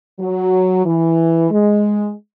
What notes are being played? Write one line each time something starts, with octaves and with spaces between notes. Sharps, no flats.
F#3
E3
G#3